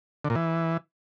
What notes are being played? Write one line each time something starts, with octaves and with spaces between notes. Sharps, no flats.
D3
A#2
E3